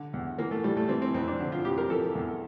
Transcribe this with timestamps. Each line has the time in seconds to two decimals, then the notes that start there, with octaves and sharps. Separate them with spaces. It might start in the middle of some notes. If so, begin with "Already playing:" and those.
Already playing: D3
0.13 E2
0.38 E3 A#3
0.51 A3
0.63 A2 G3
0.77 A3
0.89 E3 C4
1.02 C4
1.14 F2 C4
1.28 D4
1.40 D3 E4
1.52 F4
1.65 F2 G4
1.78 A#4
1.90 E3 A4
2.15 E2